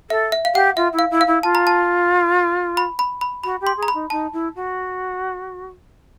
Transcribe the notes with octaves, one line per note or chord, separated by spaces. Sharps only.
A4 E5
E5
F5
G4 F#5
F4 E5
E4
F5
E4
F5
E4
F4 A5
A#5
A5
B5
B5
B5
F#4 B5
G4
C6
G#4
A#5
B5
D#4
D#4 A5
E4
F#4